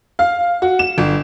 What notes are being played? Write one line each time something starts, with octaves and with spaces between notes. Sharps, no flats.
F5
F#4
E7
G1